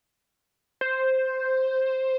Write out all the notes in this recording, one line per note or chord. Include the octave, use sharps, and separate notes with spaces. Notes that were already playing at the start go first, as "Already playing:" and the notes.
C5